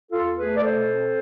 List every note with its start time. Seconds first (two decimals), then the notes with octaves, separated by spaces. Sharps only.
0.12 E2 F4 A4
0.37 A3 G#4 B4
0.56 D5
0.63 B2 A4 C5
0.88 C4